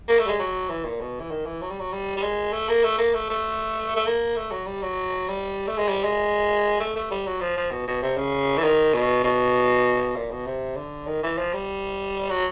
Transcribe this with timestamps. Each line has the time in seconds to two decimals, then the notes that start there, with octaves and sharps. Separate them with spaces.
0.08 A#3
0.19 A3
0.25 G3
0.29 G#3
0.39 F#3
0.69 E3
0.85 A#2
1.01 B2
1.20 E3
1.31 D#3
1.46 E3
1.62 F#3
1.70 G3
1.79 F#3
1.92 G3
2.17 G3
2.23 G#3
2.52 A3
2.69 A#3
2.84 A3
2.98 A#3
3.14 A3
3.30 A3
3.96 A3
4.06 A#3
4.36 A3
4.51 F#3
4.66 G3
4.82 F#3
5.28 G3
5.68 A3
5.78 G#3
5.89 G3
6.04 G#3
6.80 A3
6.96 A3
7.11 G3
7.26 F#3
7.41 F3
7.57 F3
7.71 B2
7.87 B2
8.02 C3
8.17 C#3
8.58 E3
8.64 D#3
8.94 B2
9.24 B2
10.16 A#2
10.31 B2
10.46 C3
10.76 D3
11.07 D#3
11.23 E3
11.38 F3
11.53 G3
12.30 F#3